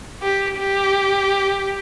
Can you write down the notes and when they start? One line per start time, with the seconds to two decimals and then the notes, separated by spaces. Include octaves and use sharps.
0.22 G4
0.59 G4